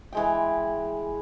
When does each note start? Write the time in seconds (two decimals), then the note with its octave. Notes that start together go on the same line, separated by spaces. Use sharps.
0.13 E3 G#3 G5